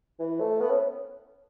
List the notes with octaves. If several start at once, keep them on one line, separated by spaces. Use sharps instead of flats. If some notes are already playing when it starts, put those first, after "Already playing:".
E3
A3
B3
C#4